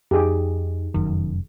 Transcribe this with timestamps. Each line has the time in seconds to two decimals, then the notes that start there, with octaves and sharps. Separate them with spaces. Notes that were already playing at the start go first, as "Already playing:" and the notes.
0.11 F2 D#4 G4 G#4
0.94 F1 F#2 D#3